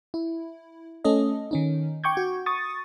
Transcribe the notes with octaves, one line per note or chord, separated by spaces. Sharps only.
E4
A3 C#4 A4 D#5
D#3 C#4 D#4
G5 C#6 D6 G6 G#6
F#4
C#6 D#6 A6